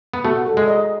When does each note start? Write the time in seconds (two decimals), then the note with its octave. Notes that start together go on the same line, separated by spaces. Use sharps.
0.14 B3
0.24 A3 F#4
0.47 A4
0.57 G#3
0.68 D#5